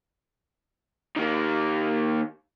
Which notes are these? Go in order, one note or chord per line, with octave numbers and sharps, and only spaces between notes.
D#3 A#3